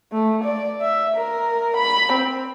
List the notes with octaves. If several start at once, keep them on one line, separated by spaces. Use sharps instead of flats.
A3
D5
E5
A#4
B5
C4